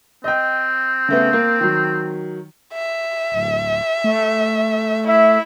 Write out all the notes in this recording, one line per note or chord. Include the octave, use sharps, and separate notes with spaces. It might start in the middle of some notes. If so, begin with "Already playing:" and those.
C4 D#5 G5
C#3 A3 B3
A#3
D#3 F#3
E5
D1
A3
E4 E5